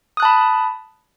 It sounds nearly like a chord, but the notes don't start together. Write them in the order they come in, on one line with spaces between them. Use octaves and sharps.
D#6 F#6 A5 B5